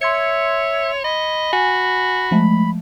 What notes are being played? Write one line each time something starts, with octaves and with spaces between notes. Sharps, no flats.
C#5 E5 C6 G#6 C#7
D#5 B5
F#4 G#5
F3 G#3 A3